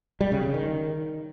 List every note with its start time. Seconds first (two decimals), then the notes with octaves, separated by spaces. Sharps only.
0.21 G3
0.32 C#3
0.43 C#3
0.54 D#3